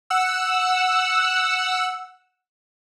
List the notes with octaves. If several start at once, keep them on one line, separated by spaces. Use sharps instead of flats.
F#5 E6